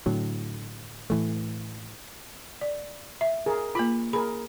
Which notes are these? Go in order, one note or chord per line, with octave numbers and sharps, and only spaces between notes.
A2 D3 F#3
A2 E3 A3
D5
E5
G#4 A#4
A#3 F4 B5
G#4 A#4 B5